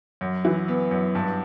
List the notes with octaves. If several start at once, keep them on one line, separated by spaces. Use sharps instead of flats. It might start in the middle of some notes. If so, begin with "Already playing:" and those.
F#2
E3
B3
F#2
G2